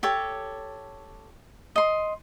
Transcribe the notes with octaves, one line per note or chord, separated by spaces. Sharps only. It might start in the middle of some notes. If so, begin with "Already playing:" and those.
G4 A4 C#5
D#5 C6